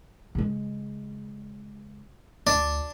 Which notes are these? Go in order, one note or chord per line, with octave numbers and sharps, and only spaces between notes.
C#3 G#3
D2 D4